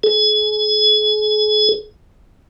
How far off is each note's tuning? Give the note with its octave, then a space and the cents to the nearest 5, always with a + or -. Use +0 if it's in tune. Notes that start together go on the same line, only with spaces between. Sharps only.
G#4 +40